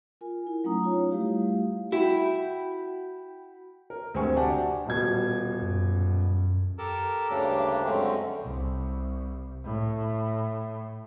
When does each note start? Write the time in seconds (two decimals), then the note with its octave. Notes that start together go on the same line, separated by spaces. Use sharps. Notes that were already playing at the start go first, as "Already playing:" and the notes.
0.21 F4 A#4 G#5
0.47 E4
0.64 F#3 A3 C#4 D#4 A#5 D#6
0.84 F4 C#5
1.11 G3 A3 E4 G4 F5
1.92 E4 F#4 G5 B5
3.90 A#4
4.14 D2 C3 C4 G#4 G#5 C#6
4.37 D4 F#4 G4 F#5 G#5 A5
4.86 D#1 B2 G#6
5.62 F#2
6.78 G4 A4 A#4 A5
7.30 D2 G2 C#3 A#3 D4 G4
7.85 F#2 D3 G#3 A3 C4 C#4
8.42 C2
9.64 A2